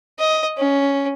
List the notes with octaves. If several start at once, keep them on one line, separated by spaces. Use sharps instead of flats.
D#5
C#4